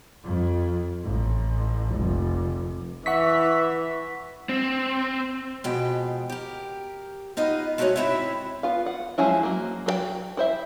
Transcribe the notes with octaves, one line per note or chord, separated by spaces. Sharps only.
F2
A1
F1
E3 E5 F#5 C#6 B6
C4
B2 F3 G#3 G5
G4 A#4
B3 D#4 F4 D#5
G#3 A3 D#4 F#4 C#5 D#5
G#2 C4 E4 F4 C#5 E5
B3 F4 F5
F#5
F3 F#3 G#3 C#4 E4
F#3 A#3
F#3 A#4 G5
E4 C5 E5